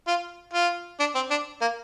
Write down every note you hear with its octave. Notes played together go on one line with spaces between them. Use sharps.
F4
F4
D4
C4
D4
A#3